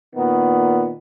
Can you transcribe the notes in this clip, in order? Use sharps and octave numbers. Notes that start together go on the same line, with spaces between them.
A#2 D#3 B3